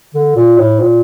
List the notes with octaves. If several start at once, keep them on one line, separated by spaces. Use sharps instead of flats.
D3
A#2
A2
A#2